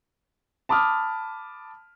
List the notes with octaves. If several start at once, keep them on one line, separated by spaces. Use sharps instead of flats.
A5 B5 D6 D#6 F6